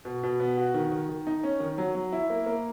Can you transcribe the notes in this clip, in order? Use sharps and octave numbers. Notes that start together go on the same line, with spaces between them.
B2
B2
B3
F#4
D#3
D#3
D#3
D#4
C#4
D#3
F#3
F#3
E4
A#3
A#3